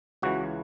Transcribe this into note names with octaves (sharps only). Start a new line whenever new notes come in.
C#2 C#3 E3 F#4